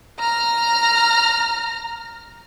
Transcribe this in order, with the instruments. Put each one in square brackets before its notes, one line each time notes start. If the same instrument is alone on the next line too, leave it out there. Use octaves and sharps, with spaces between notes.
[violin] A#5 F6